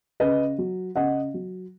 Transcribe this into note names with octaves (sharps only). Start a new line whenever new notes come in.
C#3 B4 D#5
F#3
C#3 D#5 F#5
F#3